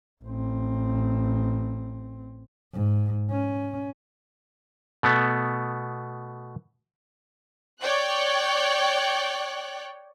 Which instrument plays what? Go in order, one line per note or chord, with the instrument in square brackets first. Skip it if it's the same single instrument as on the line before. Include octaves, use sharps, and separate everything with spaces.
[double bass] A1 C4
G#2
C#4
[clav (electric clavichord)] B2 A3 B3
[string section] C#5 D5 G5 F#6